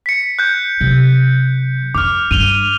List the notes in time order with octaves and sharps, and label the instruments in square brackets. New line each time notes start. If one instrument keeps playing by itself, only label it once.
[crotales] B6 C#7
F#6 G6
[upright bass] C3 F#3
[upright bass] F2 [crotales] D6 F6
[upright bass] G2 [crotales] D#7 F7 G7